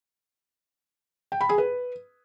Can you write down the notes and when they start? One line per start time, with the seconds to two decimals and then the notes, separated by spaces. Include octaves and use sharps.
1.32 G5
1.41 B5
1.49 G#4
1.58 B4